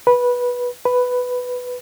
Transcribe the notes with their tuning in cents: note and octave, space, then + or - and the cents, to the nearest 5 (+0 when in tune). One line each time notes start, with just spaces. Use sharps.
B4 -15
B4 +5